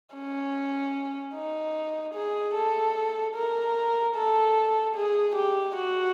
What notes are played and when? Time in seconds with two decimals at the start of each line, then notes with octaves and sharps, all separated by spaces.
0.14 C#4
1.35 D#4
2.15 G#4
2.55 A4
3.35 A#4
4.15 A4
4.95 G#4
5.35 G4
5.76 F#4